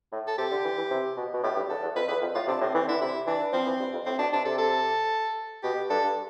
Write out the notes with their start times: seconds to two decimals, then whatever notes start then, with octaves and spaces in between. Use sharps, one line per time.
0.12 A2
0.27 A4
0.38 C3 G4
0.51 D3
0.64 E3
0.78 E3
0.90 C3
1.17 B2
1.34 B2
1.43 A2 G4
1.56 G2
1.69 E2 A4
1.83 E2
1.95 F2 B4
2.08 E2 B4
2.21 F2
2.35 A2 F4
2.48 C3 D4
2.61 A2 C4
2.75 E3 C4
2.87 D3 E4
3.01 C3 E4
3.26 E3 D4
3.53 F3 C4
3.66 E3
3.79 G2
3.93 F2
4.06 A2 C4
4.19 B2 D4
4.33 C3 D4
4.45 C3 A4
4.58 A4
5.63 B2 G4
5.90 G2 A4